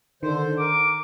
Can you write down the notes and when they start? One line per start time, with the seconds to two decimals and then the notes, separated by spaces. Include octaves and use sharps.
0.23 D3 D#3 C5
0.59 A#4 D6